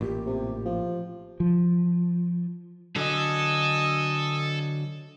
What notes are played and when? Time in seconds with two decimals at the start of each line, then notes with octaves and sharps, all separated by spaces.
0.01 A1 A#2 G4
0.26 C3
0.65 F3
1.40 F3
2.96 D3 F#3 A4 D#5 G#5